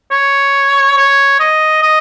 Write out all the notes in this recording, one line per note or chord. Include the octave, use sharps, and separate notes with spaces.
C#5
C#5
D#5
D#5